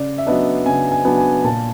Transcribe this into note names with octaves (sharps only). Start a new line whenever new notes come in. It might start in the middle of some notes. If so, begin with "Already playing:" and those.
Already playing: C#3 D5
E5
F#3 B3 D4 D#5
C#3 G#5
G#5
F#3 B3 D4
G#5
A#2 A5